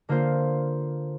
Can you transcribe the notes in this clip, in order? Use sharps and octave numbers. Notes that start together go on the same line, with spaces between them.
D3 A#3 F4 C5